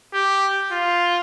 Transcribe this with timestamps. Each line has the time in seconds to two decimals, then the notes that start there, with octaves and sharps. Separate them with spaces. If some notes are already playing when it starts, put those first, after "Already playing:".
0.14 G4
0.72 F4